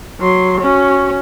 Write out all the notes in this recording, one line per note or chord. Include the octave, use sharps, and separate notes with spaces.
F#3 C6
C#4 F#4